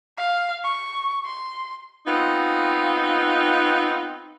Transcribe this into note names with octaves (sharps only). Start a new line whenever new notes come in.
F5
C#6
C6
B3 C4 D#4 F4